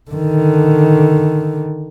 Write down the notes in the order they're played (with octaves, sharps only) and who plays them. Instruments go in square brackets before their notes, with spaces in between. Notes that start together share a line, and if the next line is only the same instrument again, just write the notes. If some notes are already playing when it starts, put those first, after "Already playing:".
[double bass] D3 D#3